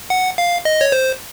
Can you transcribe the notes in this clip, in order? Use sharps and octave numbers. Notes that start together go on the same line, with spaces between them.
F#5
F5
D#5
C#5
C5